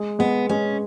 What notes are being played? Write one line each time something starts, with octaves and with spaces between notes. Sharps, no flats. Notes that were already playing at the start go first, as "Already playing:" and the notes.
Already playing: G#3
G#3 B3
G#3 C#4